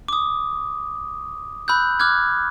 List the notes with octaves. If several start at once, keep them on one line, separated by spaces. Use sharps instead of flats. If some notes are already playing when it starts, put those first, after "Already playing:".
D6 D#6
B5 E6 F#6 G6
D6 F6 F#6 G#6